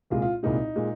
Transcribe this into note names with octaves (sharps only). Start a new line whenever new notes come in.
C2 A#2 G#3 F4 G#4
F4
C2 A#2 G#3 D#4
A#2 G#3